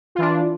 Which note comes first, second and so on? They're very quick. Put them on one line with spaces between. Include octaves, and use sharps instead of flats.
F4 E3 D4